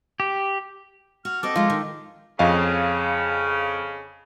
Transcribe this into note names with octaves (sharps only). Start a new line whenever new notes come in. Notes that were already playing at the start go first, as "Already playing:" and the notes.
G4
F#4 F6
C4 F#4 A4 C5 D#5 D6
F3 G#3 F4
D#3
F2 C#3 D#5 F5